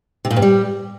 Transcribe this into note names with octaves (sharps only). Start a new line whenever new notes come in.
C3
A#2
G2
G3